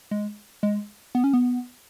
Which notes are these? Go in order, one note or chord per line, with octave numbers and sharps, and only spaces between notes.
G#3
G#3
B3
C#4
B3